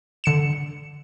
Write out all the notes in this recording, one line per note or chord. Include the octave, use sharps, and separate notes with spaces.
D3 C#7 E7